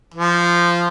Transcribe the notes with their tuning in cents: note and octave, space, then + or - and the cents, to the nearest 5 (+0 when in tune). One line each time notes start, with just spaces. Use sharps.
F3 -10